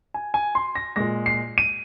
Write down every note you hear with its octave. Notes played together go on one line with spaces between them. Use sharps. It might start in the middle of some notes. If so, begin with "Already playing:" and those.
G#5
G#5
C6
A#6
A#2 G#3 A#6
C7
D#7